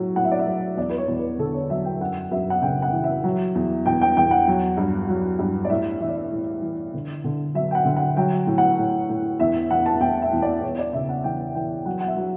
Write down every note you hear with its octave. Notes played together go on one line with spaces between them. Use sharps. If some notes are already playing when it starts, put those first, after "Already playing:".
Already playing: A2 F#3
A2 F#5
E5
D5
E5
F#3
E2 D5
B4
C#5
E2
B4
D3 A4
C#5
F#3 E5
G5
F#2 F#5
F#2 E5
F#5
C#3 G5
F#5
E3
E5
F#3
E2
E2 G5
G5
E2 G5
F#5
F#3
G2
F#3
G2
D5
A2 E5
E3 E5
D5
E5
A2
E3
D3
D3
F#3 E5
G5
F#5
D3
F#5
F#3 G5
A2
F#5
A2
A2
E2 E5
E2 F#5
A5
E2 G5
E5
E2
D5
E2 C#5
D5
C#3 E5
F#5
E3 G5
E3 G5
F#3 F#5
F#5
E5
F#3